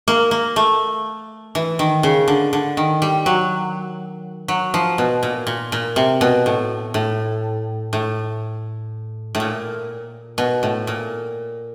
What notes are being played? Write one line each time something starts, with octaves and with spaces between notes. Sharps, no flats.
A#3
A#3
A3
E3
D#3
C#3
D3
D3
D#3
G3
F#3
F#3
F3
B2
A#2
A#2
A#2
C3
B2
A2
A2
A2
A2
A#2
B2
A2
A#2